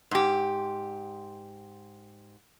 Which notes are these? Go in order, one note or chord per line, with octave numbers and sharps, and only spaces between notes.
G#2 G4